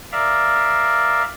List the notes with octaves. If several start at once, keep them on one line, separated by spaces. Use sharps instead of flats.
A#4 D5 E5 F5